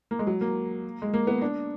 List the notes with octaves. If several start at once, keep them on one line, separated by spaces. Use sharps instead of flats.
A#3
G#3
F#3
A#3
G#3
A#3
B3
D4